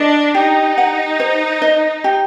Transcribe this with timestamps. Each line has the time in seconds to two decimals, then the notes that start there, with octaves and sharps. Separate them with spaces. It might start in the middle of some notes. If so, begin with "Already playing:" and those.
Already playing: D4 D#5
0.35 D#4 G4
0.78 F#5
1.20 C5
1.62 D#5
2.04 G4